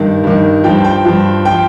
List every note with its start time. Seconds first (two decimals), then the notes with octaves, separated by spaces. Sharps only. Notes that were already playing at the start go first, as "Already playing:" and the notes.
Already playing: G2 D#3
0.24 G2 D#3
0.64 G2 F3 G5
0.84 G5
1.05 G2 F3
1.45 F3 G5